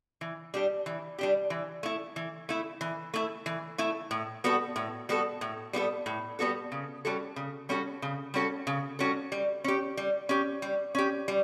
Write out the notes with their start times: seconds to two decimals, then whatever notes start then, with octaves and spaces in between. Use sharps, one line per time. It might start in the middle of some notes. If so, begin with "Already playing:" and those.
0.21 E3
0.54 G3 D4 G4
0.86 E3
1.18 G3 D4 G4
1.50 E3
1.83 A3 E4
2.16 E3
2.49 A3 E4
2.81 E3
3.14 A3 E4
3.46 E3
3.78 A3 E4
4.11 A2
4.44 G3 B3 F#4 A4
4.76 A2
5.09 G3 B3 F#4 A4
5.41 A2
5.73 G3 B3 F#4 A4
6.06 A2
6.39 G3 B3 F#4 A4
6.72 C#3
7.05 G3 C#4 F#4 A4
7.36 C#3
7.69 G3 C#4 F#4 A4
8.02 C#3
8.34 G3 C#4 F#4 A4
8.67 C#3
8.99 G3 C#4 F#4 A4
9.32 G3
9.64 C#4 G4
9.97 G3
10.29 C#4 G4
10.62 G3
10.95 C#4 G4
11.28 G3